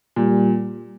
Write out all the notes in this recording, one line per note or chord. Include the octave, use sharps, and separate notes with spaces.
A#2 G3